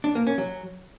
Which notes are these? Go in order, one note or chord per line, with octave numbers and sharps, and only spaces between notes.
D4
A#3
C#4
F#3